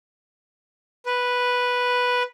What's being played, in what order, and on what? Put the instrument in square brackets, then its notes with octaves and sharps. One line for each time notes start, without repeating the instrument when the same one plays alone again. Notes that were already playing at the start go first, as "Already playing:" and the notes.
[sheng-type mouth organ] B4